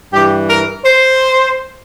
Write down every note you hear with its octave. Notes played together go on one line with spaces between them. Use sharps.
G2 E3 G4
A#4
C5